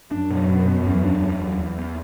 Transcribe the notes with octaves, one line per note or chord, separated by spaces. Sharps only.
F#2 D4
B2
B2
B3
E2
D4
F#3
E2
E2
B3